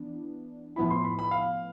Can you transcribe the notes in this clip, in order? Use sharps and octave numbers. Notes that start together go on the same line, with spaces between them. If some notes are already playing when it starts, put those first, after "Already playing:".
Already playing: E3 B3 D4
A2 F3 B3 E4 B5
C6
B5
B5
F5